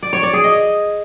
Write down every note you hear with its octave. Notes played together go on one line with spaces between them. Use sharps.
D5
C#5
D5
G#4
D#5